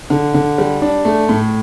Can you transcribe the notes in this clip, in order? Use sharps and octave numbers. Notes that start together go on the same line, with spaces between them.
D3
D3
G3
D4
A3
A2